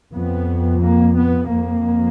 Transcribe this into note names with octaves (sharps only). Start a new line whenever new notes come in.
F2 B3
A#3
B3
F2 A#3